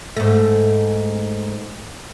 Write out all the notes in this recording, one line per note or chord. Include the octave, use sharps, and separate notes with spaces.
G#2 A3